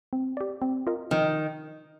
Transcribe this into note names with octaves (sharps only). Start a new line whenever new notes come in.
C4
G4 D5
C4
F4 A#4 D#5
D#3 F3